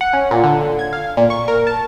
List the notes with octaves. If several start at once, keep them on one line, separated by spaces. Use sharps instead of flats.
F#5
C#4
A#2
D3
G#6
F5
A#2
C#6
A#4
A5